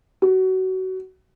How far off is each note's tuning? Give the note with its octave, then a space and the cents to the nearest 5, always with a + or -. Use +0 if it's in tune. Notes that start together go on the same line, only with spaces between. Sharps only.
F#4 +25